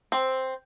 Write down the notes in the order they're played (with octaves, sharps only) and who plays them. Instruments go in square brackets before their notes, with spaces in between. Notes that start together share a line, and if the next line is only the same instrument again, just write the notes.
[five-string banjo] C4